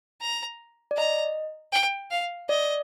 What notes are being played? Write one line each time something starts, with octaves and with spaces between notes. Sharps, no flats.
A#5
D5
D#5 A#5
G5
F5
D5 D#5